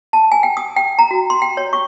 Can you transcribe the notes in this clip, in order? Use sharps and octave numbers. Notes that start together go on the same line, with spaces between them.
A5
G#5
G5
D#6
G5
A#5
F#4
C6
G5
C#5
C#6